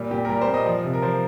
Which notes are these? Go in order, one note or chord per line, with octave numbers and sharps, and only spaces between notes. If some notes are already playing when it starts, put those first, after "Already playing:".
Already playing: A#2 G3
A#2 G4
A#4
G3 G4
C5
A#2
D#5
F3
C3
A#4
F3 C5